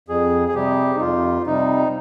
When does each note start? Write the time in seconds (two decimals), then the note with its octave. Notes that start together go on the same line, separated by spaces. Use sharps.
0.08 F2 G#4
0.48 G#4
0.55 C3 G3 G4
0.96 D#4
1.01 F2 F4
1.47 C3 G3 D#4